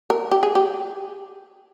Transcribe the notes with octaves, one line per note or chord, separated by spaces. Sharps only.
A#4
G4
G#4
G4